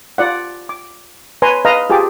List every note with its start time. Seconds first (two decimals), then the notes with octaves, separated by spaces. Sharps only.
0.18 F4 D5 F#5
0.69 D6
1.42 B4 C#5 G#5 A#5 C6
1.65 B4 D#5 F5 A#5
1.90 F4 G4 G#4 A5 D6